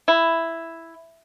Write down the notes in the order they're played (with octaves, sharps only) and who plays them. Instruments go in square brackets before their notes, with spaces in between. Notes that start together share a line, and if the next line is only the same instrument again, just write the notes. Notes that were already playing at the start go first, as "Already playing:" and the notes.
[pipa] E4